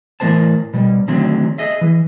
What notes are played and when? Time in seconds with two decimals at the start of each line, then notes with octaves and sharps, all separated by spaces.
0.20 A2 E3 B3 A#4 C5 A5
0.73 B2 G3
1.08 D3 D#3 F#3 A3 C4
1.58 G#4 D#5 E5
1.81 E3